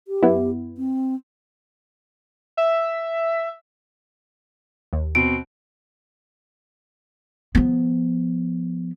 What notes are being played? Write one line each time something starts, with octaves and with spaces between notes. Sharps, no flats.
G4
F#2 B3 E4
C4
E5
D#2
B2 C4 D7
F3 B3